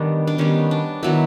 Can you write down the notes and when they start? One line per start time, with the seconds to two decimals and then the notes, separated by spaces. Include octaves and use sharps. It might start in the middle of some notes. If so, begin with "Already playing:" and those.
Already playing: D#3 G3 B3 D4
0.27 D4
0.38 D#3 G3 B3 C#4
0.71 D4
1.03 D#3 F#3 B3 E4